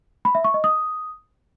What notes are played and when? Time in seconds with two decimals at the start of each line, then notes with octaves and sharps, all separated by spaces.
0.25 B5
0.35 E5
0.44 C#6
0.54 D#5
0.64 D#6